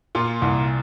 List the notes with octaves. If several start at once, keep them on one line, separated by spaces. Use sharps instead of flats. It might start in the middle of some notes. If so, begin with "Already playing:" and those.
A#2 F4
C2